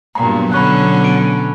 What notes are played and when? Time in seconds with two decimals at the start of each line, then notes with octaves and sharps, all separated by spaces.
0.15 G2 A#2 F#3 B3 A#5
0.52 B2 D3 C#4 B5 C#6 F#6
1.04 D7 D#7